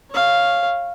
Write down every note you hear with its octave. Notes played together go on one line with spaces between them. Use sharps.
C#5 F5